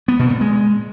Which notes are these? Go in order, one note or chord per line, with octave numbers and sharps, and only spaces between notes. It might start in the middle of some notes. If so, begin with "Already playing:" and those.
B3
B2
A#2
G#3